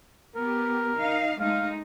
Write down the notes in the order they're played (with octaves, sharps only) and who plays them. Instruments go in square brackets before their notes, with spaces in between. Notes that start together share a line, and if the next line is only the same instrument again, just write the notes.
[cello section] B3 G4 [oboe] A#4
[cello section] D#4 F5
[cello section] G#3 A3 D#4 [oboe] F5